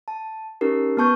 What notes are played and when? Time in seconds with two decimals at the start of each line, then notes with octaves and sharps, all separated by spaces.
0.08 A5
0.61 C#4 D#4 G4 A#4
0.97 B3 B4 A5 C#6 G6